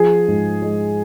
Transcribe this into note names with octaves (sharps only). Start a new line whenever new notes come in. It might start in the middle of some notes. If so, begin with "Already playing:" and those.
Already playing: F3 G#4
G#2
G#3